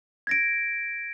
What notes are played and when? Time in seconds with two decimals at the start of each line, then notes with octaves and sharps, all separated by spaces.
0.27 G#6 A#6 D7